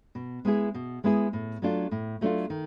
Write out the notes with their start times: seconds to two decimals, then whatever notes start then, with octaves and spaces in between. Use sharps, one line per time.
0.15 B2
0.45 G#3 B3 E4 G#4
0.74 B2
1.04 G#3 B3 E4 G#4
1.33 A2
1.62 F#3 A3 D4 F4
1.91 A2
2.21 F#3 A3 D4 F4
2.50 D#3